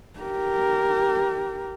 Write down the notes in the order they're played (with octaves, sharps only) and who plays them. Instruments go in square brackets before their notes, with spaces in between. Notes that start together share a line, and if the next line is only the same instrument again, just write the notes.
[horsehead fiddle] G4 A#4